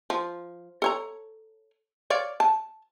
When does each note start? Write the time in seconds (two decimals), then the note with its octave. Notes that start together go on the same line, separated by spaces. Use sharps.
0.10 F3
0.82 A4 C#5 A#5
2.10 C#5 D5 F5
2.40 A5